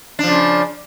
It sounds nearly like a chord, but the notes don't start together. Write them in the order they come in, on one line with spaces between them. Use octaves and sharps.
D4 F3 C#3